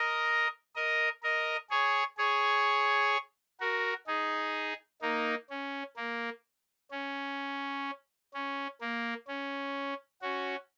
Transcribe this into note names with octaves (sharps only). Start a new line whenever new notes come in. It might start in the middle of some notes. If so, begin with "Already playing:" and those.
Already playing: A#4 D#5
A#4 D#5
A#4 D#5
G#4 C#5
G#4 C#5
F#4 A#4
D#4 G#4
A#3 D#4
C#4
A#3
C#4
C#4
A#3
C#4
C#4 F#4